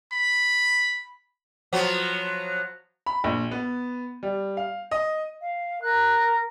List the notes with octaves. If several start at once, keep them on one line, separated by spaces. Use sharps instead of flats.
B5
F3 F#3 B3
B5
A#1
B3
G3
F5
D#5
F5
A#4 F#6